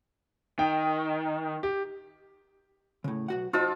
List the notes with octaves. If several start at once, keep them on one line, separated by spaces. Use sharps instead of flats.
D#3 G5
G4
A2 C#3
B1 F#4 F#5
F3 D#4 F4 F#4 D#5 E6